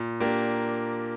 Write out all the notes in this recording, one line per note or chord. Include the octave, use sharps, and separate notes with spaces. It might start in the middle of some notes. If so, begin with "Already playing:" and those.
Already playing: A#2
A#3 D4 G4